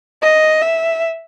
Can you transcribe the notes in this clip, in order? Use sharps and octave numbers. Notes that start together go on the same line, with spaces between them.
D#5
E5